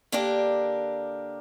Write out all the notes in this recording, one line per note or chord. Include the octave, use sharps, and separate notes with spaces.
D3 A#3 D4 G4 A#4